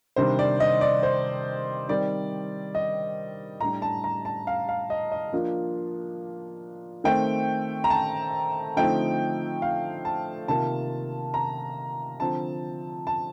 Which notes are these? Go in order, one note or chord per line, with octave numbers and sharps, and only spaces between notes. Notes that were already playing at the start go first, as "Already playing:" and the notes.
C3 D#3 G3 D4 C5
D5
D#5
D5
C5
D#3 G3 C4 D5
D#5
A2 G3 D4 A#5
A5
A#5
A5
F5
F5
D#5
D#5
F3 A#3 D4 F4
D#3 A3 C4 G5
A#5
A5
D3 F3 A3 C4 D#4 G5
F5
A5
C3 D#3 A#3 F4 A5
A#5
D3 F3 C4 A5
A5